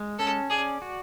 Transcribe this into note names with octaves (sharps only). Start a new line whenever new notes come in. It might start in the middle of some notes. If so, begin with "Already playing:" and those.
Already playing: G#3
C#4 A4
G#4 D5
F#4